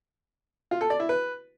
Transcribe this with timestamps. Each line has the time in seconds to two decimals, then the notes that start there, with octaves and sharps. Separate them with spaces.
0.71 F4
0.81 A4
0.90 D5
1.00 E4
1.09 B4